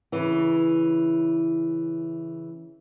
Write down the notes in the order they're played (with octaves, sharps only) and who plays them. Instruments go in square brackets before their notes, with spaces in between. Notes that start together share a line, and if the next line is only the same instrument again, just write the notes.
[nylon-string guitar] C#3 E3